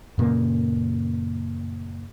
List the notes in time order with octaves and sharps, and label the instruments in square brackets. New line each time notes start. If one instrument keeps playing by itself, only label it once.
[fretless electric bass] F#2 A#2 C#3 A#3